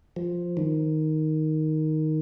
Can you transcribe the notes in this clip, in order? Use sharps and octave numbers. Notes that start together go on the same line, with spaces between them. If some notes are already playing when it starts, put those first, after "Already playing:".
F3
D#3